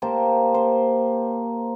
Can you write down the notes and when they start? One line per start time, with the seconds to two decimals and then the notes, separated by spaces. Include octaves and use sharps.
0.02 A#3 G4 C5 A5
0.54 C5